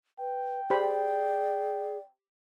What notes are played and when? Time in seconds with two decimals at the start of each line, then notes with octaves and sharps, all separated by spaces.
0.19 B4 G5
0.70 G4 G#4 C5 D5 B5